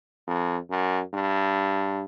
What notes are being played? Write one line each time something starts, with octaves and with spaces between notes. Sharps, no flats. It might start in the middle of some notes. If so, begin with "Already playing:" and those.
F2
F#2
G2